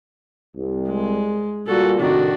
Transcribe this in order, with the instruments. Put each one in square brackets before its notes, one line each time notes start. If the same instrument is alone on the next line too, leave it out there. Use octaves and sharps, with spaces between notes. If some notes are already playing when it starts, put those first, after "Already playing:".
[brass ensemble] C2
[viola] G#3
[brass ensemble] G2 A#2 [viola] F#4 A4
[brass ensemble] A2 C3 D#3 [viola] D4 F#4